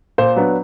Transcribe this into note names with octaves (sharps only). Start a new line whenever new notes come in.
A#2 C5
F#3 B3 D4